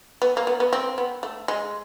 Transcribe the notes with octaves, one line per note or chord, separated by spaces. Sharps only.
B3
A#3
B3
B3
C4
B3
A3
G#3